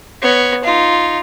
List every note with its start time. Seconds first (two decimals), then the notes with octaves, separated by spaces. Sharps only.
0.22 B3 C#5
0.63 D#4 F4